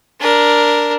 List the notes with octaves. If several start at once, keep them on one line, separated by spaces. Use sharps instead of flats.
D4 A#4